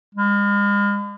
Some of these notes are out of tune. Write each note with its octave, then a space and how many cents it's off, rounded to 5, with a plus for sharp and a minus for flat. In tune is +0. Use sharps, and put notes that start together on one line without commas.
G#3 -45